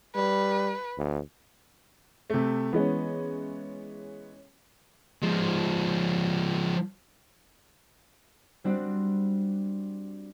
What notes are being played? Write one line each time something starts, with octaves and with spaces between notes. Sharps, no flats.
G3 B4
D2
C3 A3
E3 G#3 B3 C#4
F3 G#3
G3 C4 D4 F#4 C5